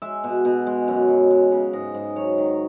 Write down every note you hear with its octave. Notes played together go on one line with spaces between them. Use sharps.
G#3 E5
B2
B2
G#3
F#2
F#2
G#3
C#3
G#2 D#5
G#2
F#3 C#5
D#3